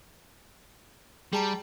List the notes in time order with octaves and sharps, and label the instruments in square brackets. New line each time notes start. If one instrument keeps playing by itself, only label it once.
[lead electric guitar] G3 [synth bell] G#4 A5 A#5